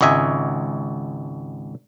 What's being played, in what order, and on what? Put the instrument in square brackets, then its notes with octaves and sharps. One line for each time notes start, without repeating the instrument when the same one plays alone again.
[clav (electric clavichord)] G#1 C#2 D#5 E5 G#5